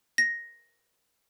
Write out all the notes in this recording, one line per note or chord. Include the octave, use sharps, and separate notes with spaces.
A#6